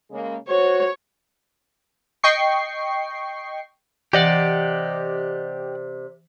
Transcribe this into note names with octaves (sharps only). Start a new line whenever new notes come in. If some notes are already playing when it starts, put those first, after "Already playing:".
C#3 G#3 A#3
F#4 C5 C#5
D#5 G5 C#6 C7
C3 E3 G4 D5 D#5 F#5